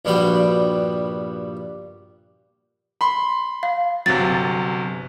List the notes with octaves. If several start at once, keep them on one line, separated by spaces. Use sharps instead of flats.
A#1 G2 G3 B3 F#4 G5
B5 C6
F5
G1 C3 F#3 A6